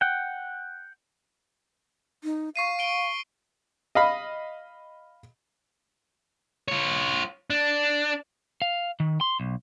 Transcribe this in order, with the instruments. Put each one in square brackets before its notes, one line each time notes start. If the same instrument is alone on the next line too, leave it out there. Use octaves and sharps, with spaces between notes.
[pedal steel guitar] F#5 G5
[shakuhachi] D#4
[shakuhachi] F5 [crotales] C#6 C7 D#7
[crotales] D7 G7
[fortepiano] D#5 F5 B5
[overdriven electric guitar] F4 C#5
D4
[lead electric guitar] F5
D#3
C6
B1